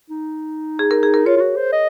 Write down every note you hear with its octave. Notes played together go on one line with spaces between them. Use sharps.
D#4
G#4
A#4
G#4
A#4
F4 C#5
F4
F#4
C5
D#5